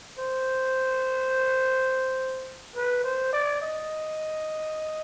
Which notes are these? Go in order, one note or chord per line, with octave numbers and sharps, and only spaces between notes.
C5
B4
C5
D5
D#5